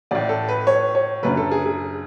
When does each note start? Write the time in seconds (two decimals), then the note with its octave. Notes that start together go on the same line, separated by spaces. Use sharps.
0.11 A1 A2 D5
0.29 A4
0.49 B4
0.67 C#5
0.95 C#5
1.23 F#1 F#2 D3 B4
1.37 A4
1.51 G#4
1.66 G#4